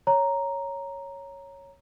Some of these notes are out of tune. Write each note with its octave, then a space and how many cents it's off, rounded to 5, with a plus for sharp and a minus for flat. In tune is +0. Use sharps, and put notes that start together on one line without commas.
C#5 +0 A#5 +0